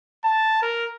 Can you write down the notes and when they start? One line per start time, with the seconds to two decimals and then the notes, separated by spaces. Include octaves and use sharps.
0.24 A5
0.62 A#4